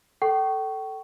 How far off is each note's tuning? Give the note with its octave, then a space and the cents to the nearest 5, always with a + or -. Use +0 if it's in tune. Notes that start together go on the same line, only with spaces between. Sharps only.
A4 +0 G5 -35 C#6 +0